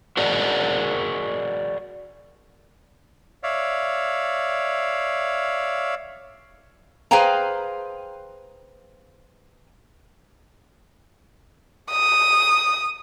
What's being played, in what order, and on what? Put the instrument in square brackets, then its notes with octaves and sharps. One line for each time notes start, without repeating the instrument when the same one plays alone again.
[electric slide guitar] F#4 G#4 A#4 D5 D#5 F#5
[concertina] C#5 D5 E5 F5
[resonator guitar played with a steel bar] G#4 B4 C5 F5 G5 A#5
[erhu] D#6